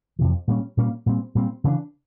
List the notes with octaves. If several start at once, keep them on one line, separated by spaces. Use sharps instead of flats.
F2 C3 E3
A#2 G3 A#3 C#4
A#2 G3 A#3 C#4
A#2 G3 C4
A#2 G3 C4
C#3 E3 A3 D4